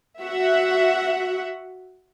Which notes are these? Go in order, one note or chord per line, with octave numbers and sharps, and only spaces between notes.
F#4 E5 F#5